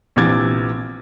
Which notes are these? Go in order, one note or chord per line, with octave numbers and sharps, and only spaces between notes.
A#1 C3 E3 D6 G#6 A6